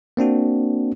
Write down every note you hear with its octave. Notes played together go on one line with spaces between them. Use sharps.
A#3 C4 D4 F#4